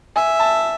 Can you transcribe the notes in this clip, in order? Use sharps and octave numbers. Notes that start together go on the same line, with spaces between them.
E5 G#5
A5